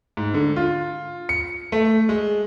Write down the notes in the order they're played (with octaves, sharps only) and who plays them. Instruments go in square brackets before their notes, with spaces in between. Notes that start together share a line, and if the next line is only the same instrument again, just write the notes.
[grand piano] G#2
D3
F4
C#7
A3
G#3